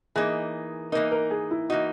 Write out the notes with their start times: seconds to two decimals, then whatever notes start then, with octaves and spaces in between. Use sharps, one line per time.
0.16 E3 A#3 D#4 G#4
0.92 E3 A#3 D#4 A#4
1.12 A#4
1.31 G#4
1.51 E4
1.69 E3 A#3 D#4 F#4